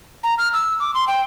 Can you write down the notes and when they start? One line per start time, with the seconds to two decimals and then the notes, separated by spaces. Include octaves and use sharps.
0.23 A#5
0.38 F6
0.53 E6
0.80 D6
0.94 C6
1.07 G5